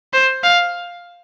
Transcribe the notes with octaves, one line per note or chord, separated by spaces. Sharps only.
C5
F5